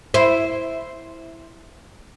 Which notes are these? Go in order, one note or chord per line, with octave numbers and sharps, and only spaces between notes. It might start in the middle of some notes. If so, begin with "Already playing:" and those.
E4 C5